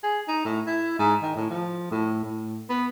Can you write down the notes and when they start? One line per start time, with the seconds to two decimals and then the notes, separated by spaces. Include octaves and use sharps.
0.03 G#4
0.28 D#4
0.45 A2
0.66 E4
0.99 G#2
1.22 D#3
1.35 A2
1.50 F3
1.91 A2
2.23 A2
2.69 B3